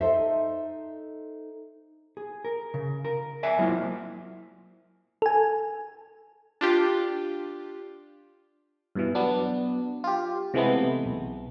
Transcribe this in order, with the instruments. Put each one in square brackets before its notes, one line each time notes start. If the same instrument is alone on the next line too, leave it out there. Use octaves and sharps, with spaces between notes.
[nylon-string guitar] D#4 A4 C5 D#5 E5
[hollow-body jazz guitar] G#4
A#4
C#3
A#4
D5 E5 G#5
F#3 G#3 A#3 C4 E4 F4
[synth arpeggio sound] A4 G#5
[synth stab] D4 F4 G4
[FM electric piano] G2 B2 E3
F#3 B3 D4
F4 G4
C3 E3 G#3 A3 B3
B1